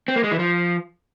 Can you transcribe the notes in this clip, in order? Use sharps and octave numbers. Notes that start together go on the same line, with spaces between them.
C4
A#3
G#3
E3
F3